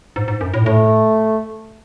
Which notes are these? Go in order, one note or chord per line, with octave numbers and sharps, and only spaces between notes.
G#2
G#2
F#2
A2
A2 A3